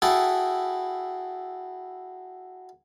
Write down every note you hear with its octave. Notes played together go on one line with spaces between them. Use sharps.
E4 F#4 G#4 A4 G5 B5